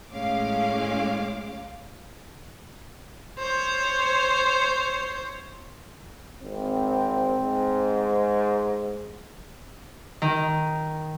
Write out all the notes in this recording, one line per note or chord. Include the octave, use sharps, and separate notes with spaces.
A2 G#3 C#4 F5 D6
C5 C#5
G#1 C4
G#2
D#3